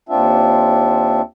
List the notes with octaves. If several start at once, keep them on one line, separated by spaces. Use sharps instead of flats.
D#2 C4 D4 F4 E5